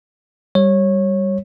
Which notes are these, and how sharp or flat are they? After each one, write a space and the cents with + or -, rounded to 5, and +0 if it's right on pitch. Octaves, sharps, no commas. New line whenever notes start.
G3 +0 C#5 -15